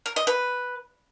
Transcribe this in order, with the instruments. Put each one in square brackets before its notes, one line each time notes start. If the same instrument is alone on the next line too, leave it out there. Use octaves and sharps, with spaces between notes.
[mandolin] A#4
D#5
B4